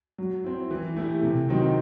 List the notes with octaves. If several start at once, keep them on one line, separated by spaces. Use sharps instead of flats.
F#3
C4 E4
E3
A3 E4 G4
C3
D#3 F#3 C4 D#4